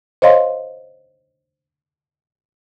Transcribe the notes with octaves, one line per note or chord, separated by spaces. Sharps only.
C5 C#5 D#5 F5 C6